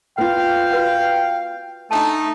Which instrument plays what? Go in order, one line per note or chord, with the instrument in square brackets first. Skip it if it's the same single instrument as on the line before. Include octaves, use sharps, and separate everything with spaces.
[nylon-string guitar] B3 F4 [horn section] F5 [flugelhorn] G5
[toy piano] F#4 B4 F#5
[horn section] A3 D#4 [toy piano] D4 A5